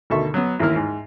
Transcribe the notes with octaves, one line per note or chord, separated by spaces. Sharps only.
D2 B2 D#3 A4 E5 C#6
F#3 B3
A1 D#2 D#3 A#3 E4 F6
G#2